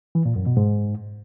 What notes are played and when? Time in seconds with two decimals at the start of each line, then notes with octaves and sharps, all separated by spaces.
0.15 E3
0.25 A#2
0.36 F#2
0.46 B2
0.57 G#2